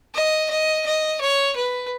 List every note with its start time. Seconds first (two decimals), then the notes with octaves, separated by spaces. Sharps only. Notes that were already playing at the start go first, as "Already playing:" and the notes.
0.14 D#5
0.50 D#5
0.86 D#5
1.21 C#5
1.56 B4